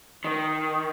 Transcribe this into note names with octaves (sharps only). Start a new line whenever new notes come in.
D#3